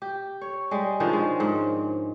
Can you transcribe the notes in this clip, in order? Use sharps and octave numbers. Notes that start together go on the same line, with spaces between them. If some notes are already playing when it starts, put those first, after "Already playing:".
G4
C#5
G3 G#3
D#3 F3 C#4 D4
G#3
G#2